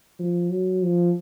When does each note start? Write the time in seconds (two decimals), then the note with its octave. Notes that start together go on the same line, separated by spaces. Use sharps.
0.19 F3
0.51 F#3
0.83 F3